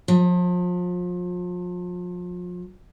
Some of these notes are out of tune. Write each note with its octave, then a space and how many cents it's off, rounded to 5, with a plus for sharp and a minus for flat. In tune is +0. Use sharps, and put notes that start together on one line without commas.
F3 +35